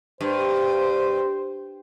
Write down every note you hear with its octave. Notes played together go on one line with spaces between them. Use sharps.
G2 C5